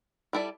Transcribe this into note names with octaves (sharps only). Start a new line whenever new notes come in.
G3 E4 A4 D5